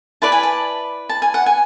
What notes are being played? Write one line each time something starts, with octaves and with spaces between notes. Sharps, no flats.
E4 B4 D5 A5
G#5
A5
A5
G#5
F#5
G#5